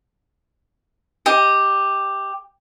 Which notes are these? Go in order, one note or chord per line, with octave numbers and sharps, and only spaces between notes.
G4 D#5